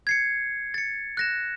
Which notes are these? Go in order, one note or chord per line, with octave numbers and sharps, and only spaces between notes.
G#6 C7 C#7
A6 C#7
F#6 A#6 E7